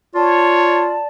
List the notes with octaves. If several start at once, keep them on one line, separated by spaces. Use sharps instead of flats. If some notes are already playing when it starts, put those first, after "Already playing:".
F4 C#5 D5 A5